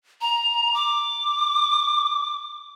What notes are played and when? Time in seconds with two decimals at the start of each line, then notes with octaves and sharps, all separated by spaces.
0.21 A#5
0.74 D6